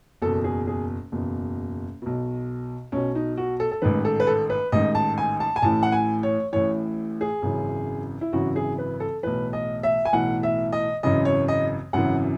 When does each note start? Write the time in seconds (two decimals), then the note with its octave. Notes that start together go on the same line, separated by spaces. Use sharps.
0.22 F#1 E2 B2 A4
0.44 G#4
0.67 G#4
1.12 F#1 E2 B2
2.02 B1 B2
2.92 B1 B2 C#4
3.15 D#4
3.37 F#4
3.60 A4
3.71 A4
3.82 A1 G#2 D#3 B4
4.05 A4
4.20 B4
4.27 A4
4.50 B4
4.72 A1 G#2 D#3 D#5
4.95 A5
5.18 G#5
5.40 A5
5.56 G#5
5.62 A1 A2 E3 A5
5.83 F#5
5.92 G#5
6.23 C#5
6.52 A1 A2 E3 C#5
7.21 G#4
7.42 G#1 F#2 C#3 E3
8.21 E4
8.33 G#1 F#2 C#3 E3 F#4
8.56 G#4
8.78 B4
9.00 A4
9.23 B1 A2 E3 B4
9.53 D#5
9.83 E5
10.05 G#5
10.13 B1 A2 E3 F#5
10.43 E5
10.73 D#5
11.03 G#1 F#2 C#3 E3 D#5
11.25 C#5
11.48 D#5
11.93 G#1 F#2 C#3 E3 F#5